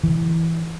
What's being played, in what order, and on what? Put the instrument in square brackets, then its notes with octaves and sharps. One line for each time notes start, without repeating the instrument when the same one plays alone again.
[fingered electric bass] E3